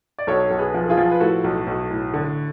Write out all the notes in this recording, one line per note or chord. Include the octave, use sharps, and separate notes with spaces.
D5
B1 A4 C#5
B1
G#4 B4
F3
A4
F4 G#4
F3
B4
A2 F#4 A4
B1
B1
A2
D3